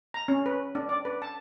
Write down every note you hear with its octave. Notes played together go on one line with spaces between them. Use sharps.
A#5
C#4
B4
D4
D5
B4
A5